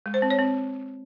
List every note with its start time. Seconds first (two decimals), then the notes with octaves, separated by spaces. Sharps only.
0.06 G#3
0.14 C5
0.22 C4
0.30 C#5
0.39 C4